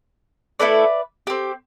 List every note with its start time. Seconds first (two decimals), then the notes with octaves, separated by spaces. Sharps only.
0.60 A3 E4 A4 B4 D5
1.27 C4 G4